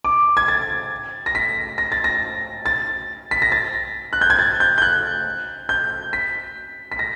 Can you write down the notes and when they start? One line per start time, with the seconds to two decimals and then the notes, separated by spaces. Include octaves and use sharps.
0.04 D6
0.37 G#6
0.48 A6
1.26 A#6
1.35 B6
1.78 A#6
1.92 A6
2.04 A#6
2.66 A6
3.31 B6
3.42 A#6
3.52 A6
4.13 F#6
4.21 G6
4.30 G#6
4.39 A6
4.60 G6
4.78 G6
4.82 F#6
5.69 G6
6.13 B6
6.92 B6
6.99 A#6